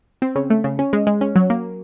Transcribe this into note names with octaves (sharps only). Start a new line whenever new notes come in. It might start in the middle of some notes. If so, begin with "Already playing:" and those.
C4
C#3
A3
C#3
C#4
G#3
G#3
C#4
F#3
A#3